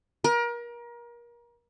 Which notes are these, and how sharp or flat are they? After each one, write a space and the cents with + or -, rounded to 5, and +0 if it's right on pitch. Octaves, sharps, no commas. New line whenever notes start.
A#4 +30